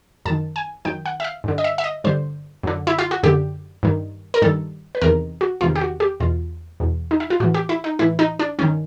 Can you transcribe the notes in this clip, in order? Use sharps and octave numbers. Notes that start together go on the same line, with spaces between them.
F#2 D#3 A5
G#5
F#2 D#3 G5
F#5
E5
F5
G2 D3
D#5
E5
E5
D#5
G2 D3 C5
F#2 D3
E4
F4
F#4
F#2 D3 G4
G2 D#3
A#4
G2 D#3 A4
B4
E2 C3 D#3 A#4
F#4
E2 C3 D#3 F4
G4
F#4
G4
E2 B2 F4
E2 B2
D#4
E4
F4
A2 E3 F#4
G4
E4
D#4
A2 E3 E4
D#4
D4
G2 D#3 C#4